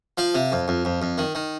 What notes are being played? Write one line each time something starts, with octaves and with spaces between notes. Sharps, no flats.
F3 F5
C3
F2
F2
F2
F2
D#3
D#3